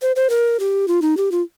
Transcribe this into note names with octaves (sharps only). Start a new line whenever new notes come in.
C5
C5
A#4
G4
F4
D#4
G4
F4